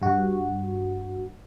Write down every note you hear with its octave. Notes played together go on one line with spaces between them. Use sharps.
G2 F#4